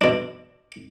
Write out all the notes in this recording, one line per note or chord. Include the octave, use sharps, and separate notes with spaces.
B2 D4